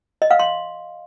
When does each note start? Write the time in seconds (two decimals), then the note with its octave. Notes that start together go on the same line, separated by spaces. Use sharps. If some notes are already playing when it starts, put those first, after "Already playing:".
0.22 D#5
0.31 F5
0.39 C6